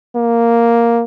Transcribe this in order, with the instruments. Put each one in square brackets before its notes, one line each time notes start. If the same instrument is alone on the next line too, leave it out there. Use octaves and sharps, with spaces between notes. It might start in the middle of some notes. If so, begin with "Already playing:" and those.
[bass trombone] A#3